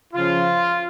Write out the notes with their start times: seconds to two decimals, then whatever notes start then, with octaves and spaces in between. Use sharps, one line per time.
0.14 C#3 F3 F4